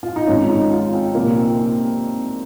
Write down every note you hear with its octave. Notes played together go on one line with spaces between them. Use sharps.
F4
D#4
G#1 G#2 F3 C#4
D#4
F4
C4
C2 A#2 F3 A#3
C4
C4